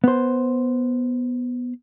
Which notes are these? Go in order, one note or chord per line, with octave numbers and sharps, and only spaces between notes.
B3 C5